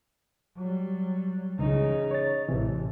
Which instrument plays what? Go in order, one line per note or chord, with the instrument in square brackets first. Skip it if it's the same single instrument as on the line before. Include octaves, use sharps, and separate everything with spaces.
[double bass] F#3 G3
[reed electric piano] C#2 E3 [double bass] C#3 D#4
[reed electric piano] C#5 A6
[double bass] A1 [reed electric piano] C3 E3